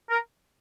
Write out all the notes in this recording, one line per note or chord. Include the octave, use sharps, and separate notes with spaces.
A#4